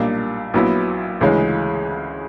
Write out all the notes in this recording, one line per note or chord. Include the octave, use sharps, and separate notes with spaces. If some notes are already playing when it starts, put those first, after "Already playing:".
Already playing: B1 A#2 G3 A#3 D4
A#1 A#2 F#3 B3 E4
D2 C#3 E3 G#3 C#4